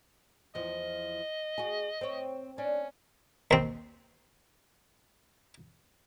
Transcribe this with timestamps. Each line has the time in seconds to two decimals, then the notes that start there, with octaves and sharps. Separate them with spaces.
0.55 E2 F3 D#5
1.58 F#4 G#4
2.01 C4 C#5
2.58 C#4 D4
3.51 D#2 C4